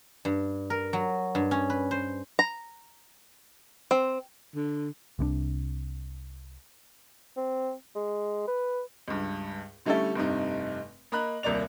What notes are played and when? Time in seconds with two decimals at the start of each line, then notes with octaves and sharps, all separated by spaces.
0.25 G2
0.70 A#4
0.93 F#3
1.35 G2
1.51 C#4
1.70 B4
1.91 C5
2.39 A#5
3.91 C4
4.55 D3
5.19 C2 C3 G3 D4
7.37 C4
7.96 G#3
8.48 B4
9.08 C#2 G2
9.85 D3 G3 A3 C#4 E4 A4
10.15 F1 G2 C3 D#4
11.12 A#3 D#5 A#5 B5 F#6
11.43 D#1 C2 A#3 D5 F7